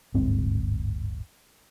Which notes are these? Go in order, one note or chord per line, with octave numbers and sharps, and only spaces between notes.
D1 G1 G#2 C4